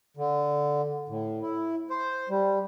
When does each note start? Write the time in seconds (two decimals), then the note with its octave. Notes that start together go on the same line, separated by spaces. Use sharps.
0.17 D3
1.09 A2
1.42 E4
1.90 C5
2.29 G3